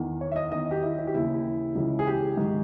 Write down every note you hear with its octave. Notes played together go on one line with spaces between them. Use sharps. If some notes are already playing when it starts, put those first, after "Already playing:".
Already playing: E2 D#3
C#5
E5
D#5
E2 D#3 D#5
G4
E4
E4
G4
D#2 C#3 E3 E4
C#2 C#3 E3
G#4
G4
G#2 D#3